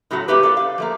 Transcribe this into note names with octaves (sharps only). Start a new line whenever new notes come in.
A2 C#3 F#3 A3 F#4
A3 A#3 C#4 E4 G4 B4
A4 D5 F5
F5
F3 A3 A#3